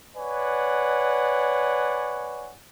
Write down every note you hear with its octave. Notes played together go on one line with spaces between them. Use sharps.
B4 C#5 D5 F#5 G#5